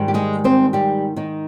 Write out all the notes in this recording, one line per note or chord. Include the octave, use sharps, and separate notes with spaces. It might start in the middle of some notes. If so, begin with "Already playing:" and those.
Already playing: G#2 D#3 G3
G4
G#3 G#4
C4 C5
G3 G4
D#3 D#4